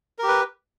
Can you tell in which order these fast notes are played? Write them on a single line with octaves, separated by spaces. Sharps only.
A#4 G4 B4